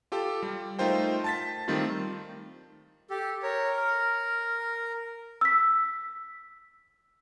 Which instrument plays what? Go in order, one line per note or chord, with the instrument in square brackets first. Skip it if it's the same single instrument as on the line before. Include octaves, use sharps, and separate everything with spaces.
[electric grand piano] F4 G4 A4
G3
A3 D#4 F4 A#4 C5 G5
A5 A6 B6
D#3 G3 A3 C4 F4
[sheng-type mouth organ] G4 [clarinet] A4
[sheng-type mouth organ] A#4 [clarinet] C#5
[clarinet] F6
[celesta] E6 B6